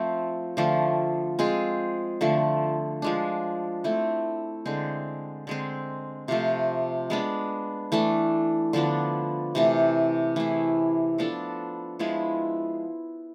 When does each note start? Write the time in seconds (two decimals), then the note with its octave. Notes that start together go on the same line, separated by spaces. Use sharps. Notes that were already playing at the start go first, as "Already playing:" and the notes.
Already playing: F3 A3 C4
0.57 D3 F3 A3
1.39 G#3 C4 F4 G#4
2.21 D3 F3 A3
3.02 F3 G#3 D4
3.84 A3 C4 E4
4.66 D3 G#3 C4
5.47 D3 G#3 C4
6.28 C3 F3 A3
7.10 G#3 B3 D4
7.92 E3 A3 D4
8.73 D3 F3 B3 D4
9.55 C3 E3 A3
10.36 E3 A3 E4 G#4
11.18 F3 B3 D4 A4
11.99 F3 G#3 B3 E4